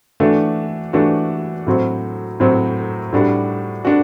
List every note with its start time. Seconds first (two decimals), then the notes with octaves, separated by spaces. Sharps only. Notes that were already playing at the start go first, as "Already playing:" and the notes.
0.20 E3 A3 D4 F#4
0.93 E3 A3 D4 F#4
1.67 A2 F#3 C4 F#4
2.40 A2 F#3 C4 F#4
3.13 A2 G3 D4 F#4
3.85 D4 F#4